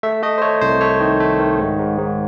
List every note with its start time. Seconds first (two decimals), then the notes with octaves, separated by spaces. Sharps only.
0.03 A3 E5
0.23 A3 D#5
0.38 C5
0.42 A3 C#5
0.61 C2 C5
0.81 A3 C#5
1.00 D#3
1.20 A3
1.40 D#3
1.58 G#2
1.79 G#2
1.98 G#2